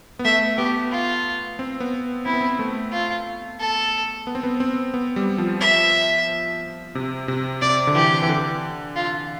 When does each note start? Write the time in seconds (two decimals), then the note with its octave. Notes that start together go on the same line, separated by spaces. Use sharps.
0.19 B3
0.25 A3 E5
0.58 B3 G4
0.92 F4
1.59 C4
1.80 B3
2.26 C4 E4
2.33 B3
2.41 C4
2.59 A3
2.92 F4
3.60 A4
4.27 B3
4.35 C4
4.43 B3
4.60 C4
4.94 B3
5.16 G3
5.38 F3
5.61 E5
6.95 C3
7.28 C3
7.62 C3 D5
7.87 D3
7.95 E3 G4
8.23 E3
8.29 D3
8.96 F4